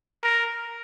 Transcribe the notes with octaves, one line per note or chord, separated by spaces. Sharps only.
A#4